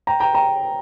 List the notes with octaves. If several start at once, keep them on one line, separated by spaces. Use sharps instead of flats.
G5 A#5
G5 A#5
G5 A#5